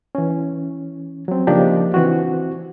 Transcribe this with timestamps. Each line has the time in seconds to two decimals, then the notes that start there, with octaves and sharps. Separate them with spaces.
0.15 E3 C#4
1.28 F#3 C4
1.47 C#3 F3 A#3 D4 D#4 G4
1.94 E3 C4 F#4